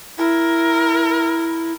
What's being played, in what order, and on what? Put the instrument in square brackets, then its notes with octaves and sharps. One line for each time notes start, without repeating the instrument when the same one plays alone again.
[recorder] E4 [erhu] A#4